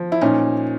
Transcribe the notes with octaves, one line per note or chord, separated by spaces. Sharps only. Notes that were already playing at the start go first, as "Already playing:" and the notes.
Already playing: F3
E4
A#2 C#4 D#4